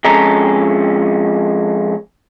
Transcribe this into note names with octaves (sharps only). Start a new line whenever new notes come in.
F2 G#3 C#4 A4 A#5